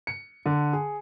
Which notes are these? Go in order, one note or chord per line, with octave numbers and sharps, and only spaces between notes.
C#7
D3
G#4